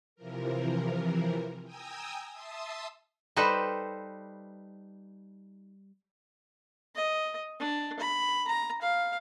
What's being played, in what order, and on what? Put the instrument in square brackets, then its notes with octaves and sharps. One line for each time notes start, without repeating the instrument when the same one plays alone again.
[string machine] C3 E3 F3 A#4
G5 G#5 A#5 D#6 E6
E5 A5 C6 D#6 E6
[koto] G3 D#4 A4 B4 C5
[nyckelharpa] D#5
D4
B5
A#5
F5